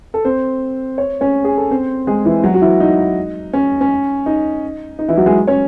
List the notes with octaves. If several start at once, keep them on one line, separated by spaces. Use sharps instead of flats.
A4
C4 C5
C#5
C#4 C#5
G#4
A4
C4 C5
G#3 G#4
E3 E4
F#3 F#4
F#4
E3 E4
D#4
C#4
C#4
D#4
D#4
E3 E4
F#3 F#4
G#3 G#4
C#4 C#5